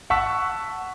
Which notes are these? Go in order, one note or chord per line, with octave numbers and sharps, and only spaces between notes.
F#5 A5 C#6 E6 B6